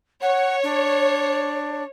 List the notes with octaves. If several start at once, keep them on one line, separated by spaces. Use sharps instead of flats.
C#5 F#5
D4